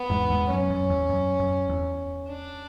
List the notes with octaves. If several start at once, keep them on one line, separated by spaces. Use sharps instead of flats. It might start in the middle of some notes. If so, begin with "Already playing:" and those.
Already playing: B3
E2 G#2
E2 G#2
F#2 C#4
F#2
E2
F#2
F#2
E2
D4